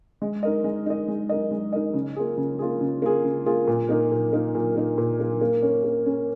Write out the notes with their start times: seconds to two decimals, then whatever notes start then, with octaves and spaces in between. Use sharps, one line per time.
0.22 G#3
0.43 D#4 A#4 D#5
0.64 G#3
0.86 D#4 A#4 D#5
1.08 G#3
1.29 D#4 A#4 D#5
1.51 G#3
1.73 D#4 A#4 D#5
1.94 C#3
2.16 A#3 F4 G#4
2.37 C#3
2.59 A#3 F4 G#4
2.81 C#3
3.02 A#3 F4 G#4
3.24 C#3
3.46 A#3 F4 G#4
3.68 A#2
3.89 A#3 D#4 A#4
4.11 A#2
4.33 A#3 D#4 A#4
4.55 A#2
4.76 A#3 D#4 A#4
4.98 A#2
5.19 A#3 D#4 A#4
5.41 A#3
5.63 C#4 A#4
5.84 A#3
6.06 C#4 A#4